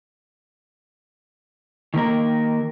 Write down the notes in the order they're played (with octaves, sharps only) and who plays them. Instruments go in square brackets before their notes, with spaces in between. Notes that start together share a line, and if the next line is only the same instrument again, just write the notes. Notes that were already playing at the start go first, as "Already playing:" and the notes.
[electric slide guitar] D#3 A#3 A#4